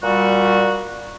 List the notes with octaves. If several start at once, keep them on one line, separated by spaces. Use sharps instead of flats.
A#2 G3 F#4